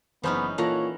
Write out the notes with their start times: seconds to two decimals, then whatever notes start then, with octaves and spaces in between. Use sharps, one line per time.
0.23 F#1 E3 B3 C#4 D#4 C5
0.58 A#2 E3 A4 C#5 F#5 A5 A#5 A#6